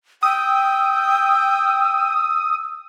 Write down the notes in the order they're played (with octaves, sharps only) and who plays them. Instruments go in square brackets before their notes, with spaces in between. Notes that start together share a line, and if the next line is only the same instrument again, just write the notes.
[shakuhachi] G5 [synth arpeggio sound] D#6 [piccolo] E6